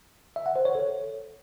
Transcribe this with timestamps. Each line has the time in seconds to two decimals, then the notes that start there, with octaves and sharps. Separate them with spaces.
0.36 E5
0.46 F#5
0.56 C5
0.65 C#5
0.75 A4